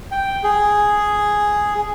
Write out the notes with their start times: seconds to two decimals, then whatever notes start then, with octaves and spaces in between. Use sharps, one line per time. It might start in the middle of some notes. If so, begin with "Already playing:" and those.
0.11 G5
0.44 G#4